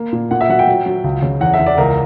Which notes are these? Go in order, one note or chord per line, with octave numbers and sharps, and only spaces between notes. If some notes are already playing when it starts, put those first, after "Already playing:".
Already playing: A#3
A#2
A#2 F#5
E5
F#3 F#5
G5
F#3
F#3
C#2
C#3
E2 F#5
E5
E2
D5
C#2 A#4